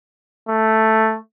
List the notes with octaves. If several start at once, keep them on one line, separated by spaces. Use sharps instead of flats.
A3